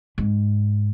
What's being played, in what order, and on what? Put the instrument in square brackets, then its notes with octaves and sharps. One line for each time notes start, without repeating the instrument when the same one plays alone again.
[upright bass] G#2